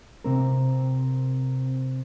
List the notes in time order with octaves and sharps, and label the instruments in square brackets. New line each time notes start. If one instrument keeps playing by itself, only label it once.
[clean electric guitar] C3 C4 A#4